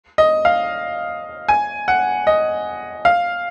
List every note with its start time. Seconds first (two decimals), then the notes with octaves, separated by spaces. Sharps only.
0.18 D#5
0.45 F5
1.48 G#5
1.88 F#5
2.27 D#5
3.05 F5